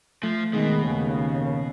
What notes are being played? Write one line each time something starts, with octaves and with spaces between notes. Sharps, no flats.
F3 A3
B2 D#3 G#3
D#2 C#3